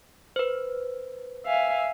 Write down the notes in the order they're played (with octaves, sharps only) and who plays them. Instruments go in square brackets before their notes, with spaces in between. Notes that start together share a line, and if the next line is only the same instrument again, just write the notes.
[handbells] B4 C5
[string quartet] E5 F5 G#5